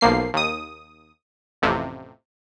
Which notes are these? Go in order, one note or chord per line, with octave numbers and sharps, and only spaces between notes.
B1 F3 A#3 C7
D#2 D#6
A1 F2 C3